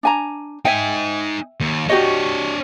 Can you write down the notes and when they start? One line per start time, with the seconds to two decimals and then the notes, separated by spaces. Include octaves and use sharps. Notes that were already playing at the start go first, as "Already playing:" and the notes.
0.03 D4 G#5 A#5
0.65 D#4 E5 G5 G#5
1.60 D#2
1.89 D4 F#4 G4 C#5 D#5